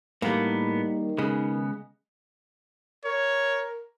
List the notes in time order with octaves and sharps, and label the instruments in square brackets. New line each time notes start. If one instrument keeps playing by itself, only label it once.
[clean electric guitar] A2 B3 [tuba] D#3 [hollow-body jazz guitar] G3 A#3
[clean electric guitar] C#3 B3 [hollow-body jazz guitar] G#3
[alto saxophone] A#4 [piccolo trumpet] C#5